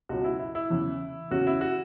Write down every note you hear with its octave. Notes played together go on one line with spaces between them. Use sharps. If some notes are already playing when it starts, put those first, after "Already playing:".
C#2 B2 F#3 F#4
E4
E4
E4
E2 C#3 E3
E2 C#3 F#3 C#4 F#4
E4
F#4